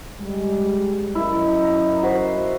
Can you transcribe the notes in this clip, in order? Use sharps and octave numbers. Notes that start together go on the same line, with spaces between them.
G3 G#3
F#2 E4 A#4 D#5
A#5
F#4 C5 B5